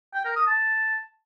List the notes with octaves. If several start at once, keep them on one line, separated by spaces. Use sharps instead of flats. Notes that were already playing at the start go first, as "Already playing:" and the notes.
G5
A#4
D#6
A5